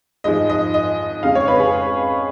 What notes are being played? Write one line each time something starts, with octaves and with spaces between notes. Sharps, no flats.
G#2 F3 G#3 D#5
D#5
D#5
F2 C#3 G#3 F5
C#5
B4
G#4